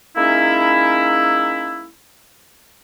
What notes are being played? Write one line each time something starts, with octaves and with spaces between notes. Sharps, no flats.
G#3 A#3 C#4 D#4 E4